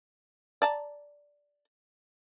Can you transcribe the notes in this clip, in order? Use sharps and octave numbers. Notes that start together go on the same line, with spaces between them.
D5 A5 A#5